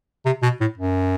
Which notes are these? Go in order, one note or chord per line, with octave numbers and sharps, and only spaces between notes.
C3
B2
A2
F#2